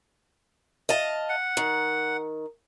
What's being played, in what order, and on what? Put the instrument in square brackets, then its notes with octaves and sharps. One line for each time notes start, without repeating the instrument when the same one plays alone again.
[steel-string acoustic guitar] D#5 F5 A5
[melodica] F#5
[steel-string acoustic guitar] D#3